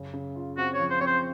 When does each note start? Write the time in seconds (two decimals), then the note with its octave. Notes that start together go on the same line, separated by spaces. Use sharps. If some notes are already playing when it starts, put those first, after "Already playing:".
Already playing: F#2 C#3
0.14 C#3
0.35 F4
0.57 C4 F#4
0.74 C#5
0.79 F3
0.90 C5
1.00 C4 C#5
1.07 C5